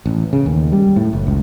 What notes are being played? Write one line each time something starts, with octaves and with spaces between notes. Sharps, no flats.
A1
C#3
D#2
G3
A2
F#1
C#2